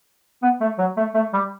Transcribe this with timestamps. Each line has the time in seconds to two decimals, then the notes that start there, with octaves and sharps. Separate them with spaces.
0.42 B3
0.60 A3
0.78 F#3
0.97 A3
1.14 A3
1.33 G3